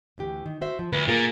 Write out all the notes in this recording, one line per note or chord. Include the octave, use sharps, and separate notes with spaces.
D2 E3 G4
D#3
F#4 C5 E5
F3
D2 B4
A#2 F4 G#4 A#4